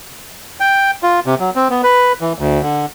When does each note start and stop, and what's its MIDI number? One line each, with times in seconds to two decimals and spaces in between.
0.60 0.91 79
1.03 1.20 65
1.26 1.35 48
1.40 1.50 54
1.56 1.68 60
1.70 1.82 59
1.83 2.13 71
2.21 2.33 52
2.39 2.62 38
2.62 2.86 50